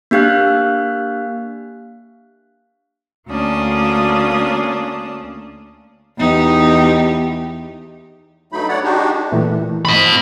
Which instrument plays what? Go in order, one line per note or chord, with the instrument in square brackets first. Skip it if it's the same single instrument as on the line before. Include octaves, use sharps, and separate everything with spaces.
[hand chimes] A#3 D4 G4 F5 F#6
[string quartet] D2 A#3 C#4 D4 D#6
[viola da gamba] E2 D#4 G4
[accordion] G2 F#3 A3 D#4 B5
A3 C#5 D5 F#5
G#3 D4 D#4 F#4 G4
[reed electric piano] A#2 E3 A3
[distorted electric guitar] D#5 B5